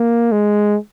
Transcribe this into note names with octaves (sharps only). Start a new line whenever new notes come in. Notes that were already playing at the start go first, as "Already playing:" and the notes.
Already playing: A#3
G#3